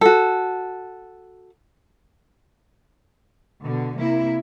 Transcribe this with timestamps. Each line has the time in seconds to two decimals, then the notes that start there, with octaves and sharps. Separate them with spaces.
0.01 F#4 A4
3.64 B2 D3
3.99 C3 A#3 E4